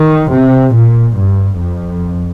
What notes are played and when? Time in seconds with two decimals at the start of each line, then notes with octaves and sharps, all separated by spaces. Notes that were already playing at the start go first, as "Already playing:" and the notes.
Already playing: D#3
0.31 C3
0.73 A#2
1.16 G2
1.58 F2